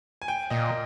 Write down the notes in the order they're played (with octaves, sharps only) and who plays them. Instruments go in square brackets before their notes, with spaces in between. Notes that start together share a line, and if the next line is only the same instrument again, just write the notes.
[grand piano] G#5
G5
[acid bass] A#2 [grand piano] D#5